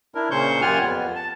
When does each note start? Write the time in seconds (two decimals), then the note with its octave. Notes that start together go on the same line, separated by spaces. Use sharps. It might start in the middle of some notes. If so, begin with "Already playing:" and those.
0.15 D4 E4 A#4
0.31 A#2 C#3 C5 C#6 G6
0.61 F#2 F4 G4 F#5 G#5 F6
0.82 F2 B3
1.16 A5